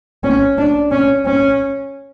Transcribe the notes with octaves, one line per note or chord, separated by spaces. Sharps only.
C#4
D4
C#4
C#4